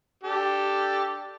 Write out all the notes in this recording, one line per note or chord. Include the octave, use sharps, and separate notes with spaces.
D4 G4 A4